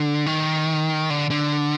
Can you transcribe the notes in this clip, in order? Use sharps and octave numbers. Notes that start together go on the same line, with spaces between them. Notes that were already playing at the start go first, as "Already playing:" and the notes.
Already playing: D3
D#3
D3
D3